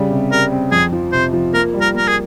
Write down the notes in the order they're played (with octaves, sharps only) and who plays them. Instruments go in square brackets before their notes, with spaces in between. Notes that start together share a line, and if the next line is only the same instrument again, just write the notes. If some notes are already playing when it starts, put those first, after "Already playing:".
Already playing: [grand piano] C#3 G3
C3
[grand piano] G3 [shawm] A#4
[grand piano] C4
[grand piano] F2 [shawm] G#4
[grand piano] F3
[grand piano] C3 [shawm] C5
[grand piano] F3
[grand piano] A#3 [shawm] A#4
[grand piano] G3
[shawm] A#4
[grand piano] A#3 [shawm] A#4
[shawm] G#4